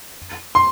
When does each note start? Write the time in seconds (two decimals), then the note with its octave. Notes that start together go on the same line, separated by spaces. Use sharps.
0.55 C6